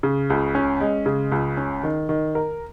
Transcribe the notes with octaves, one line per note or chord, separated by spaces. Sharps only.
C#3
C#2
C#4
G#3
C#3
C#2
C#4
D#3
D#3
A#4